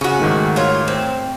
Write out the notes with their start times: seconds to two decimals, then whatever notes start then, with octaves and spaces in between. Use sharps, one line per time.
0.01 C#3 C#4 F#4
0.20 G#2 D#3 A3
0.56 F4 C#5
0.88 C4